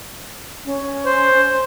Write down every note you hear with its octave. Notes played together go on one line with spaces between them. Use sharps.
C#4
C5